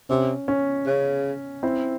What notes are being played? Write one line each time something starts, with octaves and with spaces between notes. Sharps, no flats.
C3 C#4
C#4
C#3
C4 E4